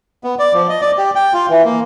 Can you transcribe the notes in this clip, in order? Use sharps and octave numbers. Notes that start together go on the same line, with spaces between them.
B3
D5
F3
D#5
D5
G4
G5
F4
E3
A#3